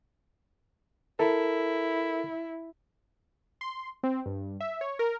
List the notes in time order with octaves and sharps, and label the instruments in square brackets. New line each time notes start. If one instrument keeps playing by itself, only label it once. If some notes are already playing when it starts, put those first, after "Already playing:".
[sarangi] E4 [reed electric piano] A4 A#4
[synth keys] C6
C4
G2
E5
C#5
A#4